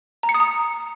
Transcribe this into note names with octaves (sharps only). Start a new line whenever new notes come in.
A#5
C#7
D#6
A#5